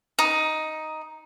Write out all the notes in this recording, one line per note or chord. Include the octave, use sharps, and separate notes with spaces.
D#4